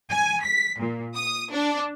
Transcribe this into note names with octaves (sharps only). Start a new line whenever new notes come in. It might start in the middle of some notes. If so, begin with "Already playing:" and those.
G#5
B6
A#2
D#6
D4